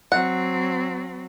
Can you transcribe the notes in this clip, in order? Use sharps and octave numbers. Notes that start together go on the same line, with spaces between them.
F#3 C4 F#5